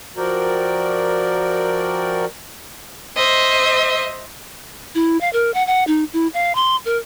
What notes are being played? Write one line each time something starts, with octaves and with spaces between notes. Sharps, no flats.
F3 F#4 A#4 D5 G5
C5 D#5 E5
E4
F5
A#4
F#5
F#5
D#4
E4
F5
C6
A#4